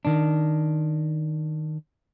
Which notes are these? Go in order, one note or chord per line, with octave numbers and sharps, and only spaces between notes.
D#3 D4